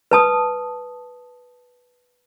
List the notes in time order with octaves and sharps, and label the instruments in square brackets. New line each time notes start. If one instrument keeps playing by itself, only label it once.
[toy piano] B4 A5 D#6